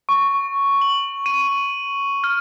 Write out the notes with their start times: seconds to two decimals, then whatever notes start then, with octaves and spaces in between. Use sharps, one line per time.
0.09 C#6
0.81 F#7
1.26 D#7
2.24 F6